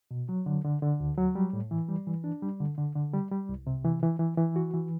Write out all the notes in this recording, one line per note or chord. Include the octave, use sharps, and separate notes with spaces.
B2
F#3
D3
D3
D3
D2
F#3
G3
A2
E3
G3
E3
D4
G3
D3
D3
D3
G3
G3
C2
C3
E3
E3
E3
E3
F#4
E3